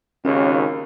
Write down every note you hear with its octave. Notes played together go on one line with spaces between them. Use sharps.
G#1 D#2 C#3 C#4